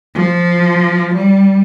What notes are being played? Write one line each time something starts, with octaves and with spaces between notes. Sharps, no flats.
F3
G3